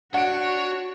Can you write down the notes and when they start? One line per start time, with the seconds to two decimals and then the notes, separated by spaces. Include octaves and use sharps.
0.14 D4 F#4 C#5 F#5 D7